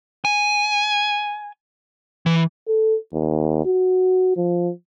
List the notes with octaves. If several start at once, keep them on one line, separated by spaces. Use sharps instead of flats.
G#5
E3
A4
D#2
F#4
F3